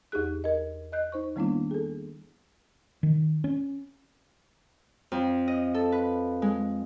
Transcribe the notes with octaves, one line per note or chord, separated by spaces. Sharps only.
E2 D#4 G4 G#4 F#6
A#4 D#5
D#5 F#6 G6
D#4 C5 C#6
D#3 G3 A#3 B3 D4 E4
G#4 A4
D#3
C#4
F2
D#5
A4
B4
G#3